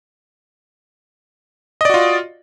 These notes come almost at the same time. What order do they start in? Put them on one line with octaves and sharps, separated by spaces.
D#5 D5 F#4 F4